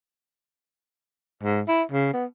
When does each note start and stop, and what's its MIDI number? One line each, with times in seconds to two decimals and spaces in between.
1.43 1.61 44
1.68 1.83 64
1.92 2.10 49
2.13 2.25 59